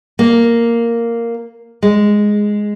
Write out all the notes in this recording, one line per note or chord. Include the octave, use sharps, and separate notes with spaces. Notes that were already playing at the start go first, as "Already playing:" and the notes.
A#3
G#3